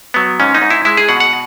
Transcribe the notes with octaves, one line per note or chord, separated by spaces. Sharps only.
F#3 B3
G#2 C#4
D#4
G#2
E4
G#3 E4
G#4
B2 F#5
F#5